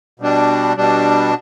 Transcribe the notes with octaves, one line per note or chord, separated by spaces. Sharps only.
B2 G3 D4
B2 G3 D4